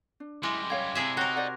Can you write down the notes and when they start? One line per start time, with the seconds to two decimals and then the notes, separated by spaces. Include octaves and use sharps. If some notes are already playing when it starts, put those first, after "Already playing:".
0.20 D4
0.43 F#2 G3 G#3 E4 C6 D6 A#6
0.70 C#5 F5 G5 G#6
0.95 C3 D4 E4 G#4 E5
1.17 D#4 F#4 A#4 C5 C#5 G5
1.36 C5 D5 F#5